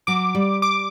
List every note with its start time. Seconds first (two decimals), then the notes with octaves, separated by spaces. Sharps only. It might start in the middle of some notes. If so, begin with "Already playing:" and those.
0.07 F#3 D6
0.35 G3
0.62 D6